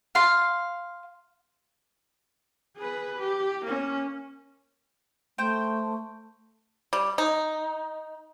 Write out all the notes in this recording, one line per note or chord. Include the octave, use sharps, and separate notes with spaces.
F5 C6
G#4 B4
G4
A#3 C#4
A3 C5 G5
G3
D#4